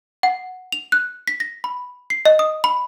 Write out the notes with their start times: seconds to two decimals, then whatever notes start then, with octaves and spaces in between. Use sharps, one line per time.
0.23 F#5
0.72 F7
0.92 F#6
1.27 B6
1.40 A#6
1.64 B5
2.10 C7
2.25 D#5
2.39 D#6
2.64 B5